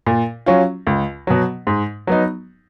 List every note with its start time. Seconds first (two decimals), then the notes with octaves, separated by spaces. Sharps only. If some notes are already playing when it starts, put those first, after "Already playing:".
0.06 A#2
0.46 F#3 C#4 F4
0.87 C#2
1.27 B2 F#3
1.67 G#2
2.07 F#3 B3 D#4